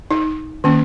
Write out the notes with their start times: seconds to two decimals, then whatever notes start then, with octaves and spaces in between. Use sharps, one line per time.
0.11 D#4
0.64 D#3 A#3 C#4